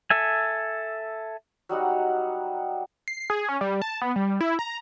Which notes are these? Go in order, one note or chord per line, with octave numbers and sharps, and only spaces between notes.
A4 E5 G#5
F#3 G3 D#4 F#5
C7
G#4
C#4
G3
A5
B3
G3
E4
A#5